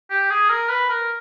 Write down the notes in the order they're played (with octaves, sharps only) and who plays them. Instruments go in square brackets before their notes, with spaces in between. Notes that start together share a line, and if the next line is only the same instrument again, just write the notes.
[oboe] G4
G#4
A#4
B4
A#4